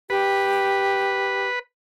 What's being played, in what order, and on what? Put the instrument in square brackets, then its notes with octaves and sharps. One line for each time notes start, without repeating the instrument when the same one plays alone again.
[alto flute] G4 [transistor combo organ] B4